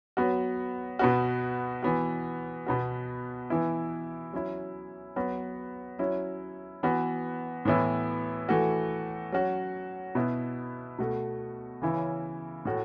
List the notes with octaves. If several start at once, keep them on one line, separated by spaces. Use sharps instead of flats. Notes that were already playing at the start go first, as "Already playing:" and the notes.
F#3 B3 F#4
B2 B3 F#4
E3 B3 F#4
B2 B3 F#4
E3 B3 E4
F#3 C#4 E4
F#3 B3 F#4
F#3 C#4 E4
E3 B3 F#4
A2 E3 B3 E4
E3 A3 F#4
F#3 C#4 F#4
B2 B3 E4
B2 A3 F#4
C#3 E3 C#4 E4
A2 A3 F#4